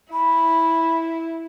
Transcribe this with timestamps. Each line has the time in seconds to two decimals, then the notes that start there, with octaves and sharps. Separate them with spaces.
0.13 E4 B5